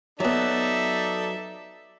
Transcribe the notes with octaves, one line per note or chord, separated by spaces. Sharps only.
F#3 B3 D#4 A4 D5 E5